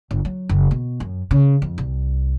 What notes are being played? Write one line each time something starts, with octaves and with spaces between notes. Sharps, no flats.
G1
F#3
F#1
B2
F#2
C#3
F2
C2